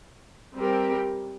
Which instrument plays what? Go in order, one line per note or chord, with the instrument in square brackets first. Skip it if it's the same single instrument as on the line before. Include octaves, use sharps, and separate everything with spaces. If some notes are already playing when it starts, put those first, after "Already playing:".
[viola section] G3 C4 G4 A#4